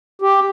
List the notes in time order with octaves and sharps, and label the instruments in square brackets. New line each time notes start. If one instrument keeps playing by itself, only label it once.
[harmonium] G4